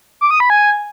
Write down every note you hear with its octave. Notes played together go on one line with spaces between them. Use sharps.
D6
D#6
B5
G#5